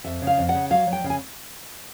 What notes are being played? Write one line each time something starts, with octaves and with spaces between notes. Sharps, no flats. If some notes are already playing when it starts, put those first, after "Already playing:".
F2 E5
C#3
F5
F2
F#5
C#3
F#3 F5
F#3
G5
C#3
G#5